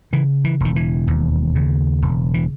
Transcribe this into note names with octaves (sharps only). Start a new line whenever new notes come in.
C#3 E3
E3
E1 D#3
E3
D#2
C#3
E1
E3